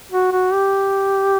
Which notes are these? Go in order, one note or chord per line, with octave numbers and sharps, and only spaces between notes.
F#4
F#4
G4